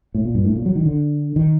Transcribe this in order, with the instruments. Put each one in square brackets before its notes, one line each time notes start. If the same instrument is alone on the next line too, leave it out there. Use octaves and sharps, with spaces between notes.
[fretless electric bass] A2
A#2
G2
A2
A#2
F#3
D#3
D3
D#3